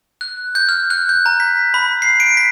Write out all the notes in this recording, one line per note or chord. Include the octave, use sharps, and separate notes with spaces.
F#6
G6
F6
F#6
G6
A#5
B6
B5
C7
D7
B6